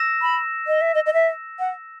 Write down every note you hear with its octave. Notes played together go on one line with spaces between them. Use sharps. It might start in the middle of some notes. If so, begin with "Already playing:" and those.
Already playing: E6 A#6 E7
B5
D#5
E5
D#5
D#5
E5
F#5